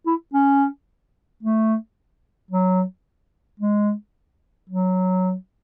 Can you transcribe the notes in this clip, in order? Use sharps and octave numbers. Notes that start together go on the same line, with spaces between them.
E4
C#4
A3
F#3
G#3
F#3